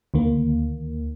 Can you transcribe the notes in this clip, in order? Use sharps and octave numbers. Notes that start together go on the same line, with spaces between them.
D2 D#3 A#3